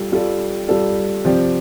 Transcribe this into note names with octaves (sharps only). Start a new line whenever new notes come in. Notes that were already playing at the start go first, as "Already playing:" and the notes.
Already playing: G3 F4 A4
G3 F4 A4 D5
G3 F4 A4 D5
C3 F3 C4 G4 D5